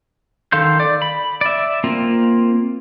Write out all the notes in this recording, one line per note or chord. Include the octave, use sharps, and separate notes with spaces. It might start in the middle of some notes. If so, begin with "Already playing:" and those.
D#3 A4 F5 C6 G6
D5
B5
D5 E5
A#3 C4 F4